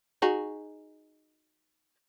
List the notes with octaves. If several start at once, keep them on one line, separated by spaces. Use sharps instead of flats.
D#4 F#4 G#4